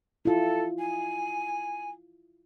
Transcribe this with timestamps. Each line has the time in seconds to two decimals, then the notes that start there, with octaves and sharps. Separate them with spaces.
0.25 E4 F4 A4
0.79 G#5